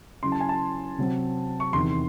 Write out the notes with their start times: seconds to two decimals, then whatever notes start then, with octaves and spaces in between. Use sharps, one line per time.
0.23 C#3 F#3 C#4 E4 C6
0.32 A5
0.40 G#5
0.49 A5
0.98 C3 F#3 C4
1.60 C#6
1.73 E2 C3 D#3 C6